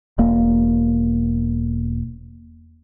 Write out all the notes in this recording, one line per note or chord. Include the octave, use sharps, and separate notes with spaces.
E1 A#3